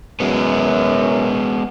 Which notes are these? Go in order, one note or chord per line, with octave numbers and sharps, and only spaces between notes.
F#2 G#3 B3